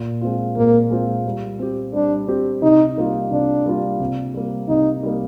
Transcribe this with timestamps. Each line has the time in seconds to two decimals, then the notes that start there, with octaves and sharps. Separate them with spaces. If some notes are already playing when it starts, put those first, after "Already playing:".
Already playing: A#2
0.21 G#3 C4 F4
0.57 A#2 A#3
0.90 G#3 C4 F4
1.26 G3
1.59 C4 G4
1.93 G3 D4
2.28 C4 G4
2.63 C3 D#4
2.97 G3 A#3 F4
3.31 C3 D4
3.66 G3 A#3 F4
4.00 C3
4.34 G3 A#3
4.69 C3 D#4
5.03 G3 A#3